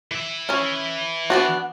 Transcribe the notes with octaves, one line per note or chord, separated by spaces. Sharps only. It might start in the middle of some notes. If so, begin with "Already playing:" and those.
E3 E5
C#4 C#5
B3 D4 F#4